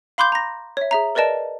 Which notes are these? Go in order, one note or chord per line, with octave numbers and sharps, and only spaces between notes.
F5 B5 C6 D6 G6 G7
A#5 A#6
C#5 E5
G#4 E5 A#5
A#4 B4 D5 D#5 A5 D7